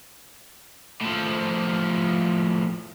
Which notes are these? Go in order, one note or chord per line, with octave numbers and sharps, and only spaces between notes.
A2 F3